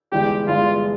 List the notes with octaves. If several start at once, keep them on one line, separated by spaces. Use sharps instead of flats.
G1 G2 E3 G#3 G4
G1 G2 E3 G#3 F4